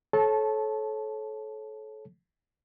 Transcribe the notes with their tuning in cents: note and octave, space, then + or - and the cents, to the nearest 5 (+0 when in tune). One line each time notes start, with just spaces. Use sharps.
A4 -30 C#5 -25 A5 -15